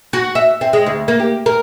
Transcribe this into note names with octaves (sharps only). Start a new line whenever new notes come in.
F#4
E5
C4
G#3
D2
A#3
G4
A#4